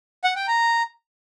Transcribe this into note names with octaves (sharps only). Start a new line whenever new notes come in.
F#5
G5
A#5